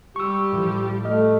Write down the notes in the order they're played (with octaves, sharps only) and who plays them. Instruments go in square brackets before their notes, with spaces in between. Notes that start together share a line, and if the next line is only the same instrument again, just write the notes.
[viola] G3 G4 [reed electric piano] C#6 E6
[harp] A2 F3
[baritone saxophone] A3 [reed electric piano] D#5 [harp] F6